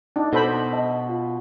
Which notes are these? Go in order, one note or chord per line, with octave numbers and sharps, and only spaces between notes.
D4 D#4
B2 A4 C5 B5
D#5 A5
F4